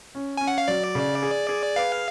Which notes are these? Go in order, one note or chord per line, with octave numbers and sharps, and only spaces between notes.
C#4
C#4 G#5
F#5
F5
F#3 D5
C#3
G#4
G#4
B4 F5